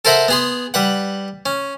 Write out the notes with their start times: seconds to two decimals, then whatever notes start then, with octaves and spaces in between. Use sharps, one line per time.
0.05 A4 A#4 C5 E5 F#5
0.28 B3 G#4 C6
0.74 G3 B4 F#5
1.46 C#4